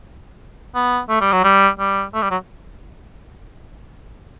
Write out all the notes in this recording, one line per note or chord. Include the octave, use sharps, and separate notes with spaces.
B3
A3
G3
F#3
G3
G3
A3
G3
F#3